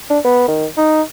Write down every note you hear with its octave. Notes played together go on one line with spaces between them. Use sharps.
D4
B3
D#3
D#4